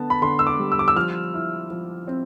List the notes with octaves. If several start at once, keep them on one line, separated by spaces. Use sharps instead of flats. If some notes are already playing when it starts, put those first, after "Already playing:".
Already playing: D3 B3 A5
B5
D3 C6
E6
D6
G3
E6
D6
E6
F3 F6
E4
F3
C4